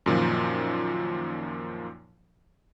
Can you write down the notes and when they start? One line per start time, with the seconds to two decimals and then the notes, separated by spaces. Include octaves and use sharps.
0.06 F#2 A#2 D#3 F3